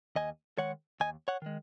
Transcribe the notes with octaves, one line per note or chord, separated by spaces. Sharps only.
D#2 D#5 G#5
D#3 G#3 C#5 F#5
D#2 D#5 G#5
C#5 F#5
D#3 G#3